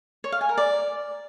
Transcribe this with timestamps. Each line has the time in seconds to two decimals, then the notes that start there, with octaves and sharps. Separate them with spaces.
0.24 C#5
0.32 F5
0.41 G#5
0.49 A#4
0.58 D5